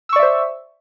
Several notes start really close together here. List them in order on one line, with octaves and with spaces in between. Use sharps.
E6 C#6 D5 E5 C5